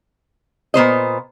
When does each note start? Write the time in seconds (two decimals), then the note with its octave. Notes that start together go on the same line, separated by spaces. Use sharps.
0.74 A#2 B3 C5 D#5